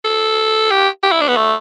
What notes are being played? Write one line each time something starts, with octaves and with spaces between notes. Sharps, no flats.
A4
G4
G4
E4
D4
B3
A3